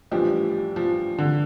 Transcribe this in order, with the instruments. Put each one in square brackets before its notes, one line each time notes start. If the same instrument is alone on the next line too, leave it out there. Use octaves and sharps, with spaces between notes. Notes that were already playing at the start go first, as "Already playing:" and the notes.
[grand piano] A2 E3 G3 D4 G4 [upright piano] F3
[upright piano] F3
D3